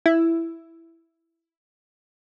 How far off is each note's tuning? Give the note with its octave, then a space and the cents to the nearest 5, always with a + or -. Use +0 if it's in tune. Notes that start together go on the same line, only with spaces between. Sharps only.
E4 +5